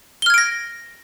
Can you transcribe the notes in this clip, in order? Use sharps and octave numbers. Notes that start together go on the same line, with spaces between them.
F6 G#6 A#6 D7 G7